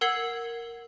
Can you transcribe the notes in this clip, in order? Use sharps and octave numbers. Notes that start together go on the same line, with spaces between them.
A#4 F#5 E6 G#6 C7 F#7